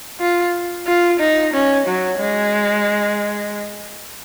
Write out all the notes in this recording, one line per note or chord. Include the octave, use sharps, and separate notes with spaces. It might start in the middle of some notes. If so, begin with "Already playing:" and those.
F4
F4
D#4
C#4
F#3
G#3